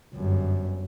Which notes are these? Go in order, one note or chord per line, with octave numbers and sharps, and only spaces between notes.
G1 F#2